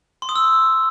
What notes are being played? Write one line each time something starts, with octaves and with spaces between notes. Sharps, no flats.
C6
D#6
E6